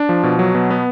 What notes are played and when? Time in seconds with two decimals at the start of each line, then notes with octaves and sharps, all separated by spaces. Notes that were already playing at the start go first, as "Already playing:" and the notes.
Already playing: D4
0.09 F3
0.23 B2
0.39 F#3
0.55 B2
0.71 B3